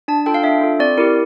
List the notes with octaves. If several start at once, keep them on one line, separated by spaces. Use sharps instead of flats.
D4 A5
F4 A4 G5
F5
D4 E5
F4 A4
C4 D5
E4 G4 A#4